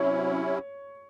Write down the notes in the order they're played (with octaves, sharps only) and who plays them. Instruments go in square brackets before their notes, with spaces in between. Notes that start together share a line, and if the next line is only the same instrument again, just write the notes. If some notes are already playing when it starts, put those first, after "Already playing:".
Already playing: [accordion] C3 F#3 C#4 E4 [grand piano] C#5